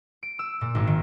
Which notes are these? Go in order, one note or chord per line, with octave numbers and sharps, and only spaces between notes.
D7
E6
A#2
G#1
D#3